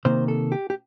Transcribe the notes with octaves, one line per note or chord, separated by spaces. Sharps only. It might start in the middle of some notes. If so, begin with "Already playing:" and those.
C3 D#3 A#3 C5
A4
G4
G4